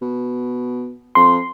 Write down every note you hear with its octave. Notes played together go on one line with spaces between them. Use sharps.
B2
F2 C6